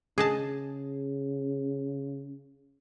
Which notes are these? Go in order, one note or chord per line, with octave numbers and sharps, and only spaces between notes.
C#3 G#4 D#5 A5